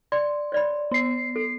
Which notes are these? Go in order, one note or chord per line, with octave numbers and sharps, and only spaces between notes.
D5 C6
C#5 D5 B5
B3 C7
A4